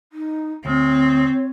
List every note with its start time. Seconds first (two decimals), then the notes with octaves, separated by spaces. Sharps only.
0.13 D#4
0.65 D2 C4 C#5